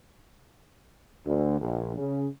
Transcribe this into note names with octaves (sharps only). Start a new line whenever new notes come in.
D2
A#1
C#3